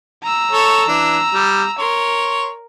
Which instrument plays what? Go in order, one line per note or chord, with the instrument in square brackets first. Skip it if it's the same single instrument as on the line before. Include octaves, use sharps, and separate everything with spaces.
[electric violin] A#5 E6
[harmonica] A4 C#5
E3 D4
G3
[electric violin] A#4 [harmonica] C#5 C6